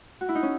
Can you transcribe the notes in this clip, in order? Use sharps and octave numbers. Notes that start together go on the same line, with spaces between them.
F#4
E4
D#4
C#4